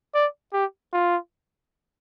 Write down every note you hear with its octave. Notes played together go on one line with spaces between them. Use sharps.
D5
G4
F4